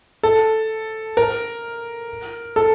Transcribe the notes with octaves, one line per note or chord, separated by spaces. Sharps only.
A4
A#4
A4